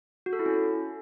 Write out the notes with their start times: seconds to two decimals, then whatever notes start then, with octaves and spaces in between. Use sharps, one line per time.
0.26 F#4
0.33 A4
0.39 E4
0.46 C#4